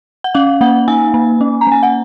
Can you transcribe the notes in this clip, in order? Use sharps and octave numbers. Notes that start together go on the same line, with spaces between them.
F#5
C#4 F5
A#3 F#5
D#4 G#5
A#3
C#4
A#5
A#3 G#5
F#5